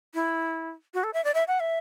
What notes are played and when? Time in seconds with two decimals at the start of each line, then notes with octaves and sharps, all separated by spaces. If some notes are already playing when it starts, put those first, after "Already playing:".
0.14 E4
0.94 F#4
1.04 A4
1.14 E5
1.24 D5
1.35 E5
1.48 F#5
1.60 E5